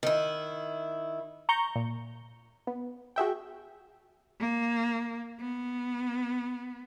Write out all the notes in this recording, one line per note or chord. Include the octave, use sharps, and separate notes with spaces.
D#3 E4
A#5 C#6 G6
A#2
B3
F#4 G#4 E5 G5
A#3
B3